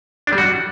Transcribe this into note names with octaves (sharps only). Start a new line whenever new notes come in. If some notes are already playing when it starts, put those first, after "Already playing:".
D4
G3
F#4